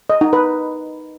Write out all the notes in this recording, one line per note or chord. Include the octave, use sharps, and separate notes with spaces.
D#5
D#4
B4